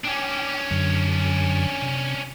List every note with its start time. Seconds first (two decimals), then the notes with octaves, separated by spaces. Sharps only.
0.05 C#4 D4 G5 D6
0.71 F#2 D3 F#3
1.82 C3